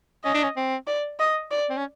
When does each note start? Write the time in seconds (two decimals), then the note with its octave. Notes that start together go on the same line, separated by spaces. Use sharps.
0.24 C#4 D#5
0.35 D4
0.43 C#4
0.56 C4
0.87 D5
1.20 D#5
1.51 D5
1.70 C4
1.77 C#4